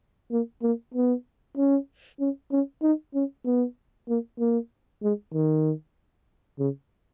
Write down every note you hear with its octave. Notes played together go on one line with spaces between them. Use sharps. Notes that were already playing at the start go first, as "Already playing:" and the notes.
A#3
A#3
B3
C#4
C#4
C#4
D#4
C#4
B3
A#3
A#3
G#3
D#3
C#3